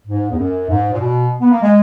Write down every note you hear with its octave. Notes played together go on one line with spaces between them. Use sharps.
G#2
E2
F#2
G#2
A#2
B2
B3
A#3
G#3